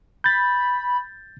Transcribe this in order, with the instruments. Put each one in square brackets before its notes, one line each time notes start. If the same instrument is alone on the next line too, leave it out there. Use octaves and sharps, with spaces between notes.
[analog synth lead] B5 [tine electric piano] G6 A6